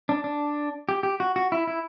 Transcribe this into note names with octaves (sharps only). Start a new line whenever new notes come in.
D4
D4
G4
G4
F#4
F#4
E4
E4